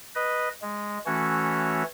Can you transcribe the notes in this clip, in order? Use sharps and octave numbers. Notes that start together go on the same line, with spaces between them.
B4 D#5
G#3
E3 A3 C#4 F#4 C#5